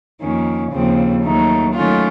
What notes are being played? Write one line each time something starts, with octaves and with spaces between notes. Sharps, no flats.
F2 D#3 A#3 C#4
D#2 C#3 F3 C4
D#2 D#3 F#3 A3 D#4
D#3 F#3 A3 C#4 F4